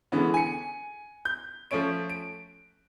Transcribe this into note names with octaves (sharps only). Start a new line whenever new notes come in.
D3 E3 G#3 B3 C#4
G#5 C#7
G6
F3 A3 C#4 C#5 D7
D7